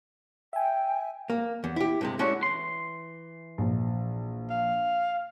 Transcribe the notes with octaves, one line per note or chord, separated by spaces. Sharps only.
E5 G5 G#5
A#3
E2
E4 G4
G2 C3 G#3
G#3 A3 C#4 D4 E4 F#4
E3 C6
A#1
F5